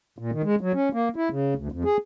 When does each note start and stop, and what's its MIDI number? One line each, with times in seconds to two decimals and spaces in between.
0.18 0.31 46
0.32 0.42 51
0.43 0.55 56
0.61 0.72 54
0.74 0.89 61
0.93 1.09 58
1.16 1.29 64
1.30 1.54 49
1.56 1.68 38
1.72 1.83 41
1.85 1.97 68